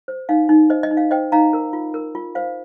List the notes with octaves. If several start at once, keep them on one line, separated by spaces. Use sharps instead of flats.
C5
D#4 F5
D#4
C5 D#5
D#5
D#4
F5
C5 D#5 G5
D#4 F5 A#5
A#4
F4
A#4
F4
C5 F5